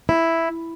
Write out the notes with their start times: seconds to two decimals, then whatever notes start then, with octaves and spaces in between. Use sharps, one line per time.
0.09 E4